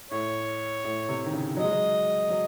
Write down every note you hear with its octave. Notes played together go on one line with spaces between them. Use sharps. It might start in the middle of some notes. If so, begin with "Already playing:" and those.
A2 C#5
A2
C3
D#3
C#3
F#3 D#5
G#3
F#3
F#3